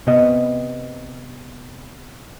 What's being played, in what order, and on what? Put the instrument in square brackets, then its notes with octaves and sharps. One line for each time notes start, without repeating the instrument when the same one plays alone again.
[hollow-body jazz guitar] C3 B3 D#5